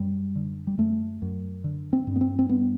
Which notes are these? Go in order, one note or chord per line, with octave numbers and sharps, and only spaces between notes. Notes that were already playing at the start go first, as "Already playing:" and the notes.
Already playing: F#2 G3
D3
G3
F#2 A3
F#2
D3
C4
G2
B3
C4
C4
G2 B3